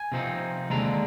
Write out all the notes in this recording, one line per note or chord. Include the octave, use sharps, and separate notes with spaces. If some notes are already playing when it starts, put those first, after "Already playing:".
Already playing: G#5
C3 F3 C4 D#4
D#2 D3 G#3 D4 A#5